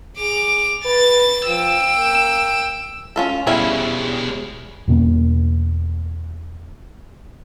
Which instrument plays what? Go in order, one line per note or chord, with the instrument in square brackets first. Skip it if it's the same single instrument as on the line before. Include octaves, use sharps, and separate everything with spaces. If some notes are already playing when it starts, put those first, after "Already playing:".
[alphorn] G#4 [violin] D6 F7
[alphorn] B4 [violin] A6
[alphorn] F3 [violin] G5 E6
[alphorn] A#3
[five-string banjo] C#4 F4 A4
[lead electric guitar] B2 G#3 [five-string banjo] G3 C#4 E4
[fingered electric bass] E2 B2 A#3